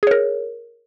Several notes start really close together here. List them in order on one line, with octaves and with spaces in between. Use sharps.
G#4 C#5 A#4